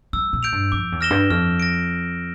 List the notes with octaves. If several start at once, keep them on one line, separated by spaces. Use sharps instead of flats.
G3 E6
A#2
G6 D7 F7
G2
F2 D6
E2
F6 A#6 E7 G7
G2
F2 F6
A#6 D7